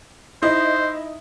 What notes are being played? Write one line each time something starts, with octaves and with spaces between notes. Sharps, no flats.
D#4 E4 C5 D#5 E5